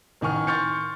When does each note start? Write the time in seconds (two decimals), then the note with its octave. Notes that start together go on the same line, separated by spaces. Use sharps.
0.21 A1 D#3 G#5 C#6 F6
0.47 C6 C#6 F6 G6 A6 C#7